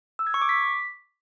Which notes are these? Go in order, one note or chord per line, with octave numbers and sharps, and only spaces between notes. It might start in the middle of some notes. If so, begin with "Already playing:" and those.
E6
G#6
C#6
D6
B6